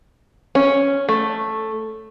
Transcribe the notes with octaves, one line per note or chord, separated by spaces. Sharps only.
C#4
A3